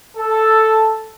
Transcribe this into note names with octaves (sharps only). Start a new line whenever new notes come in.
A4